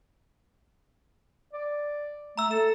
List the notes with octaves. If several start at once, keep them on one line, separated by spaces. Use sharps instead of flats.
D5
A3 A#5 E6
A4 E7